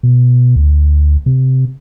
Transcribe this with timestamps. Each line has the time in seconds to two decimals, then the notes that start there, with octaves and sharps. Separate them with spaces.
0.03 B2
0.56 D2
1.26 C3